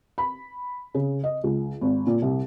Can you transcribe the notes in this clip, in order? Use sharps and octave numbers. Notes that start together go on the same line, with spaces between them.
B5
C#3
D#5
C#2
G#1
A#2
C2